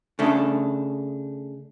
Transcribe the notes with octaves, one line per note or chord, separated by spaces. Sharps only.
C#3 A3 D4